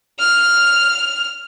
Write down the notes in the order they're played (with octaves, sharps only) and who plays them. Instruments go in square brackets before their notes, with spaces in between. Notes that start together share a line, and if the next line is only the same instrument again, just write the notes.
[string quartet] F6